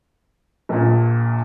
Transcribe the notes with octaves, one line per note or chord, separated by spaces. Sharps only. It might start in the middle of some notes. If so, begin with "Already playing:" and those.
A#1 A#2